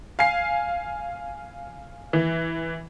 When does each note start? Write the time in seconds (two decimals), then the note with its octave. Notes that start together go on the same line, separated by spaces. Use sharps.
0.19 F5 G#5 C7
2.13 E3